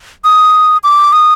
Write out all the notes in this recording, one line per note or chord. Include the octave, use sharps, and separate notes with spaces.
D#6
D6
D#6